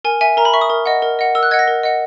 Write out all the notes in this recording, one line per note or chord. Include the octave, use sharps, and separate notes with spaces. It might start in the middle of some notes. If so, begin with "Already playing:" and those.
A#4 G#5
E5 G#5
A#4 A#5
B5
E5 C#6
D#6
A#4
D#5 F#5
A#4
D#5 F#5
A#4 E6
F#6
D#5 F#5 G#6
A#6
A#4
D#5 F#5